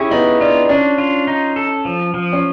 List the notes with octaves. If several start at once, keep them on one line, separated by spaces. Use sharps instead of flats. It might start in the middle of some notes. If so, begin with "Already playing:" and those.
Already playing: C#4 E4 G4 G#4
B3 D#4
D4 F4
C#4 D4
F4
D#4
A4
F3
F3
C#4